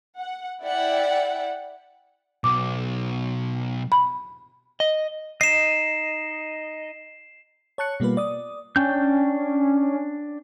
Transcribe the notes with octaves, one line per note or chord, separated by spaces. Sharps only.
F#5
E4 D5 E5 F#5 G5
B1 D6
B5
D#5
D#4 D#5 C7 E7
C#5 A5 F#6 C#7
B2 G3 A#3 F4 B4
D5 D#6
C#4 D4 G5 G6